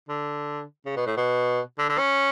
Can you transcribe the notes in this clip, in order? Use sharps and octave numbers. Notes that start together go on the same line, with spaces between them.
D3
C#3
B2
A2
B2
D3
D3
C#4